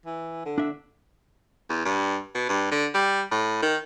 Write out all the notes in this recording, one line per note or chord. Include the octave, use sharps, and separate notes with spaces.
E3
D3
D4 E5
E2
G2
B2
G2
D3
G3
A2
D#3